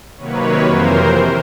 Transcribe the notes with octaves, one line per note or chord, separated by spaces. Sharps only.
C3 D#3 F#3 A#3 B4 C#5
F2 C3 E3 A#4 C5